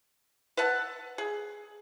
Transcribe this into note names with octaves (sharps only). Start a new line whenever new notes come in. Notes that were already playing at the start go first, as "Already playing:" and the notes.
B4 E5 F#5 A5
G#4